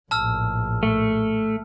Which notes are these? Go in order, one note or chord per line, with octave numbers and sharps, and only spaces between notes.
A#1 A2 A5 E6 F6
A3